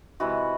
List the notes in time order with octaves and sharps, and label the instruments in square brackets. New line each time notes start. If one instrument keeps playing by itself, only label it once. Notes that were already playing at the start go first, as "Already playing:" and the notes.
[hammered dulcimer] C3 E3 G#3 F#4